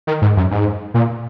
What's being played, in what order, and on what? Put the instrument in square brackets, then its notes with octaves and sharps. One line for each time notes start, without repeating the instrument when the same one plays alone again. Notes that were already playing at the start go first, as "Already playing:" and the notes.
[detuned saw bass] D#3
G#2
F#2
G#2
A#2